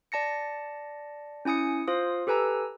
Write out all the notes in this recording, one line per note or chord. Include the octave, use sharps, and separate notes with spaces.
D5 A5 A#6 C#7
C#4 E4 G#5 D#6 C#7
F4 C5 F5 D#6
G4 A4 B4 G#5 A#5 E6